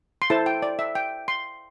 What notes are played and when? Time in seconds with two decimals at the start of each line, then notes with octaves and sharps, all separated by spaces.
0.22 C6
0.30 E4 A4 C5 A5
0.46 G5
0.62 D5
0.79 E5
0.95 G5
1.28 C6